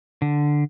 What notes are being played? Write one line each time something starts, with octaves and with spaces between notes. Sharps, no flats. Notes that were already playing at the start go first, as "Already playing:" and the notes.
D3